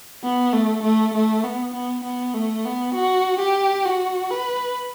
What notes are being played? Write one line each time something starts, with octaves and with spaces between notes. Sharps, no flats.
B3
A3
A3
A3
B3
B3
B3
A3
B3
F#4
G4
F#4
B4